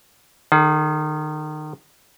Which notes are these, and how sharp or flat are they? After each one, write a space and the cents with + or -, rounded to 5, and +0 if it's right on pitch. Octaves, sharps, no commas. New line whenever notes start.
D#3 -25 G#4 +40